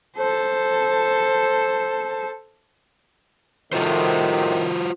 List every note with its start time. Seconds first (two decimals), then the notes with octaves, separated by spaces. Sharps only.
0.17 A4 C5
3.73 A2 C3 D#3 F4 F#4 C5